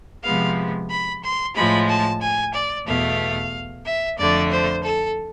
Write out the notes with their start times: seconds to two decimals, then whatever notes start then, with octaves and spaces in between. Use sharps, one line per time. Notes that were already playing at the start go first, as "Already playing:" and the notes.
0.24 C3 F3 G#3 B3 F5
0.89 B5
1.22 C6
1.55 A2 F3 G#3 B5
1.88 A5
2.21 G#5
2.54 D5
2.86 E2 B2 A3 F5
3.85 E5
4.18 F2 D3 A3 D5
4.51 C5
4.84 A4